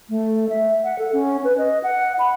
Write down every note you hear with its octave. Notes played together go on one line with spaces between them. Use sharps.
A3
E5
F#5
A4
C#4
B4
D#5
F#5
B5